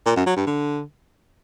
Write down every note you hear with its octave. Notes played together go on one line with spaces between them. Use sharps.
A#2
F#2
F#3
G2
D3